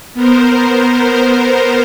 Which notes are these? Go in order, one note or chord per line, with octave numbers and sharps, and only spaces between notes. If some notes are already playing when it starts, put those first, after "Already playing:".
B3 A#4 C5